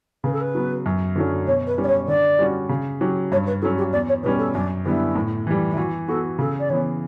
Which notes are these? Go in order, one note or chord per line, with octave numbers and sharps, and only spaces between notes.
C#3 B4
A4
B4
F#3 B3
F#2
D3 F#3 A3 C#4
B2 C#5
B4
G3 C#4
D5
C#5
D3 D5
G3 C#4 F#4
C#3
F#3 C#4 G4
G2 C#5
B4
F#3 C#4 A4
G4
E2 D5
C#5
B2 G3 C#4 B4
A4
F#2 D4
D3 G3 B3 E4
A2
E3 G3
E4
E3 F#4
B3 F#4 A4
C#3 A4
D5
E3 B3 C#5